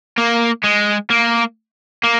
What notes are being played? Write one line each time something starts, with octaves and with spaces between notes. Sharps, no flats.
A#3
G#3
A#3
A#3